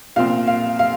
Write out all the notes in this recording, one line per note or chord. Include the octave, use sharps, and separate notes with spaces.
A#2 F3 C4 F5
F5
F5